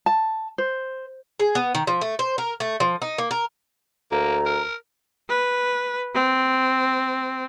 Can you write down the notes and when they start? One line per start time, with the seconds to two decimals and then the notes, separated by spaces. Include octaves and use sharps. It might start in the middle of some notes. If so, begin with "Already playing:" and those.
0.06 A5
0.58 C5
1.40 G#4
1.55 B3
1.75 D#3
1.87 F3
2.01 A3
2.19 C5
2.38 A#4
2.60 A3
2.80 F3
3.02 D#4
3.18 A#3
3.31 A#4
4.12 D2 A#3 A#5
4.46 A#4
5.29 B4
6.14 C4